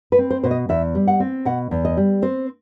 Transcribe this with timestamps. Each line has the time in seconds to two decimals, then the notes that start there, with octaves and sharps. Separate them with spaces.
0.12 B4
0.19 C4
0.30 C5
0.44 B2 C5
0.51 D#5
0.69 E2 E5
0.95 G3
1.08 F#5
1.20 C4
1.45 B2 F#5
1.71 E2
1.85 D#5
1.97 G3
2.22 C4 C5